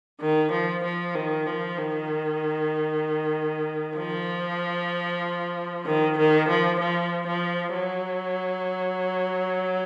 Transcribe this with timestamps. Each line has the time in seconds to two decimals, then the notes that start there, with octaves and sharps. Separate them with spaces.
0.22 D#3
0.52 F3
0.84 F3
1.15 D#3
1.47 F3
1.78 D#3
3.98 F3
5.86 D#3
6.18 D#3
6.49 F3
6.80 F3
7.27 F3
7.75 F#3